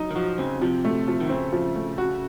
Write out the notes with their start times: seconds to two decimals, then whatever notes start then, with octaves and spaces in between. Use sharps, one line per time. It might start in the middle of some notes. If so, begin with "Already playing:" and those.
Already playing: F#3 D#4
0.11 D#3
0.15 F3 F#4
0.38 C#3 C4
0.61 C3 F3
0.85 A3
1.08 F3
1.20 D#3
1.29 C#3 C4
1.53 F3
1.76 A3
1.98 F#4